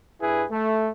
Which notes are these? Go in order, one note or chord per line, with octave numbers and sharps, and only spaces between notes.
G2 E4 G#4 B4
A3